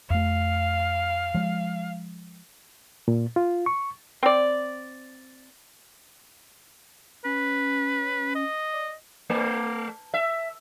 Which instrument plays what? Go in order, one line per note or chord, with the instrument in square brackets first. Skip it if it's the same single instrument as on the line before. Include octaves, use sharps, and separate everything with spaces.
[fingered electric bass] F2 A3 [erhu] F5
[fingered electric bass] F3 G#3
[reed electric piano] A#2
F4
C#6
[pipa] C4 D5
[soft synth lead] C#4 [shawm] B4
[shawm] D#5
[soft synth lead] D5
[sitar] A3
E5